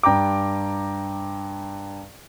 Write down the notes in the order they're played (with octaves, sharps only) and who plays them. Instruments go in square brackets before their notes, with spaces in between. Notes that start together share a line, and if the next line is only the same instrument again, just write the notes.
[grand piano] G2 G5 A#5 D6